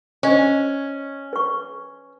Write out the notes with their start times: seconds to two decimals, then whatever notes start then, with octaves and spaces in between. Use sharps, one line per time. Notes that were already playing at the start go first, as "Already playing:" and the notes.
0.23 C#4 C5 D#5
1.33 B4 C#6